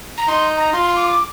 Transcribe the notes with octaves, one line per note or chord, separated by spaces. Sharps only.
A#5
D#4 C6
A#5
F4 C6
C6
D6
D6